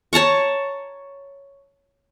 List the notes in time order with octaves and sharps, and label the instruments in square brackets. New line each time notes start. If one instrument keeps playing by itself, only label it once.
[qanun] C#5 A5 A#5 C#6